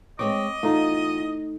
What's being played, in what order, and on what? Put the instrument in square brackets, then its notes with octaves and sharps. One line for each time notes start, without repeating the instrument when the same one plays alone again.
[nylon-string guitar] G#3 C4 C#5 [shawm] D#5 [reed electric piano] D6
[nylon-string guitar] E2 F4 [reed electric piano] A3 D#4